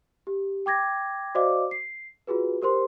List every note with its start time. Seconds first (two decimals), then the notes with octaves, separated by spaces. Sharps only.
0.27 G4
0.66 G5 D6 G#6 A#6
1.35 F#4 C5 D5 D#5 F5 D6
1.71 C7
2.27 F4 F#4 G#4 B4
2.62 G4 A#4 C5 C6